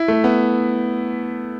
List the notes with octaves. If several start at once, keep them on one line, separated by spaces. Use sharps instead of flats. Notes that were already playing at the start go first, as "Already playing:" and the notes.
Already playing: E4
A3
B3